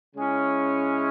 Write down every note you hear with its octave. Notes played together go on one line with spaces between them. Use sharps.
C#3 G#3 C#4 E4